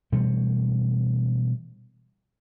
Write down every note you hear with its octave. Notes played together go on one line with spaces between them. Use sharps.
B2 E3 G3 A3